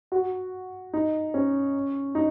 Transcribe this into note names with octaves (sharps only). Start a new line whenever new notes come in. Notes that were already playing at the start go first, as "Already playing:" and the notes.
F#4
D#4
C#4
D#4